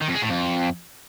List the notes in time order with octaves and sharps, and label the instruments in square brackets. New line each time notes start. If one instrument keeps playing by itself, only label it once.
[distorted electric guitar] D#3
F2
G#3
A2
F2